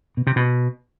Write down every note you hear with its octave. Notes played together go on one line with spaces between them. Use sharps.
B2
C3
B2